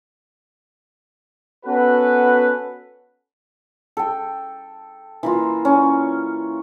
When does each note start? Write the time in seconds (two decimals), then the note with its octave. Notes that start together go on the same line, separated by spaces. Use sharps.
1.66 B3 C#4 F#4 A4 B4
3.97 A4 G5
5.23 E3 A#3 F4
5.65 C#4